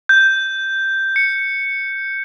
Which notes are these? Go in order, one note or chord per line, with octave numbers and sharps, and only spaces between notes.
G6
C#7